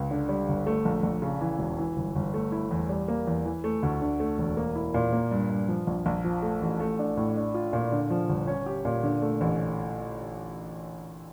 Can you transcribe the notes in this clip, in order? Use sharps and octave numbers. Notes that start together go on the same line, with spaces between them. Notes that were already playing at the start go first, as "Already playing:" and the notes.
Already playing: C#2
D3
G3
G1
A3
A#1
A#1
C#3
E3
E1
E3
G1
G1
A3
E4
E2
G3
A#3
E2
E3
A3
D2
D3
A3
E1
A#3
E4
A#2
A#3
G2
G2
F3
A#1
A#1
F3
A3
A1
A3
D4
A2
D4
F4
A#2
D3
F3
G1
C#4
G4
A#2
D3
A3
A1